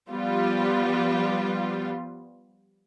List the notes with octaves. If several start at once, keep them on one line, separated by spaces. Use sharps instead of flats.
F3 G3 B3 F4